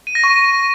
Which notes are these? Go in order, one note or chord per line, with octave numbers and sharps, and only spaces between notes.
D#7
A#6
C#6